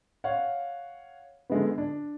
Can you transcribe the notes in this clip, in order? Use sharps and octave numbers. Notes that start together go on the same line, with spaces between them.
C#5 F5 F#5
D3 G#3 B3
D4